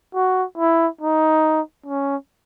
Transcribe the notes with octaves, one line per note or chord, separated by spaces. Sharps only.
F#4
E4
D#4
C#4